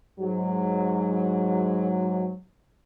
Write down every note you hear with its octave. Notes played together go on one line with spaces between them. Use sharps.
G#2 F#3